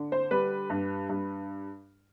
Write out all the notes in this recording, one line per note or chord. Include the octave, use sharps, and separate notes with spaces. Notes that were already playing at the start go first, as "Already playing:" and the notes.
Already playing: D3
C5
G3 B4
G2
G2